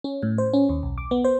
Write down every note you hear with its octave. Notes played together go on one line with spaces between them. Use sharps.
C#4
A2
C5
C#4
D#2
B1
D6
B3
C5